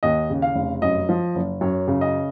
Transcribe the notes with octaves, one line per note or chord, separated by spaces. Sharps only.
D#2 D#5
C#3
F5
F1
F#2 D#5
F3
F#1
F#2 C#5
C#3
D#5